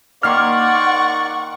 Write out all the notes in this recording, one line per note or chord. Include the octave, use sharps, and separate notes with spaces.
D#3 A#3 D5 F#5 C6 C#6 F6